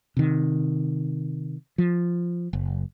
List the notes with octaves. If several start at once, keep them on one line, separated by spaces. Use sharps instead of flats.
C3 D#3
F3
F#1